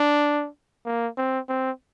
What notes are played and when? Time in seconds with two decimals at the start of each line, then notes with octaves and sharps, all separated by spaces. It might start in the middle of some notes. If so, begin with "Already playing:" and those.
Already playing: D4
0.86 A#3
1.18 C4
1.49 C4